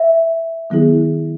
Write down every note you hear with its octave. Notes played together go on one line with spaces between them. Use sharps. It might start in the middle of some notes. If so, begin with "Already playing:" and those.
Already playing: E5
D#3 F#3 B3 E4 G#4